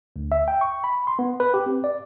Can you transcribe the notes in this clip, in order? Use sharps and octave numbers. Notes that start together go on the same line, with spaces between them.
D2
E5
G5
C#6
B5
C6
B3
B4
G4
C4
D5